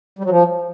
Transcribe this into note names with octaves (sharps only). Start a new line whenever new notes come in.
G3
F#3
F3